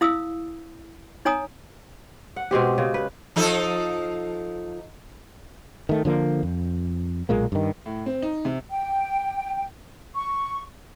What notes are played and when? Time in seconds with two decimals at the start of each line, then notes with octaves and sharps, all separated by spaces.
0.01 E4 F5 D#6 E6
1.25 D#4 C#5 G#5 A#5 D#6
2.36 F#5
2.51 B2 G#3 C4 G4
2.78 C#3
2.94 B4
3.36 F3 D#4 A4
5.89 D#3 A3
6.05 D3 F3 A#3
6.43 F2
7.29 B1 A#2 G#3 A#3
7.52 G2 D#3
7.86 A2
8.06 C4
8.22 D#4
8.45 C3
8.70 G5
10.15 C#6